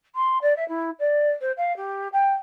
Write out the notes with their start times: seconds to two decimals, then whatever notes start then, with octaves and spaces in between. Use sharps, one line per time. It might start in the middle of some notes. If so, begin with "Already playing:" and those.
0.15 C6
0.42 D5
0.56 E5
0.68 E4
0.99 D5
1.41 C5
1.57 F5
1.76 G4
2.13 G5